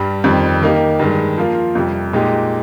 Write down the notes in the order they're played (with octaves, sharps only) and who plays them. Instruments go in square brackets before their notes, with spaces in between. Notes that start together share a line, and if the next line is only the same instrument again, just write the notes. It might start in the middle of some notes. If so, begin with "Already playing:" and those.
Already playing: [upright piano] G2 G3
F2 D#3 G3 C4
D#3 A#3 D#4 G4
G2 D#3 G#3
F3 A#3 F4 A#4
F2 C3 G3
A#2 G#3 D#4 G4